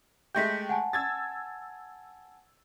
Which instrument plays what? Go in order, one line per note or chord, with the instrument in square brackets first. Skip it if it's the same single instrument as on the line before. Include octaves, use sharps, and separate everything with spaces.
[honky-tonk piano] G#3 A3 G4 [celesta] G6 A#6 B6
[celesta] F#5 G#5 A5
[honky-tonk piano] E6 G#6 A6